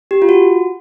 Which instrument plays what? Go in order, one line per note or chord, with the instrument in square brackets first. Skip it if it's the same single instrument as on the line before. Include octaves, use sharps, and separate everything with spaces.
[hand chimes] G4
F4
F#4